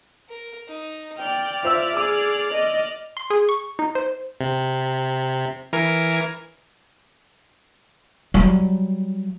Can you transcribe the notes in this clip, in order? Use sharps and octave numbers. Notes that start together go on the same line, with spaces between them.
A#4
D#4
D5 G5 F6
F4 C5 E5 E6
G#4 D6
D#5
C6
G#4
C#6
D#4
C5
C3
E3 A#4 G#6
F#3 G3